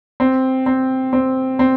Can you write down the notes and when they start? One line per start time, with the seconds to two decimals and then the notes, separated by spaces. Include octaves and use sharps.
0.20 C4
0.66 C4
1.13 C4
1.59 C4